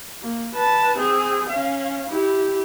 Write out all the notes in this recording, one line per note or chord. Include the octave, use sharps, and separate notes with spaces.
A#3
B4 A5
C4 G#4
C#4 F5
E4 G4